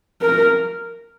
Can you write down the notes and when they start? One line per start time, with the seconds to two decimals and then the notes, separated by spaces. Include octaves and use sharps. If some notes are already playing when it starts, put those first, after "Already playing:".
0.22 A#4